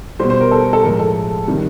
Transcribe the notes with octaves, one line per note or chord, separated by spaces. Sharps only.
B2 G3 C5
C5
A#4
A4
A4
A2 F3 G#3 A#4
A4
C3 D#3 G3